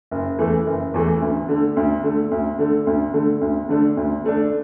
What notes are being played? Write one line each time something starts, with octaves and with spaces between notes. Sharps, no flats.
F#1
E2 E3 A3
F#1
E2 E3 A3
D2
D3 A3
D2
D3 A3
D2
D3 A3
D2
D3 A3
D2
D3 A3 D4
D2
D3 A3 D4